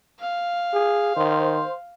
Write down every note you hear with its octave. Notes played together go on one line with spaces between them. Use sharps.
F5
G#4
D#3 C5